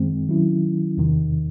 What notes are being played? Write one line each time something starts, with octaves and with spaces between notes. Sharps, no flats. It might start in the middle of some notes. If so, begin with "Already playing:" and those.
Already playing: F#2 D#3 G#3 C4
D#3 F#3 C#4 E4
E2 C3 D#3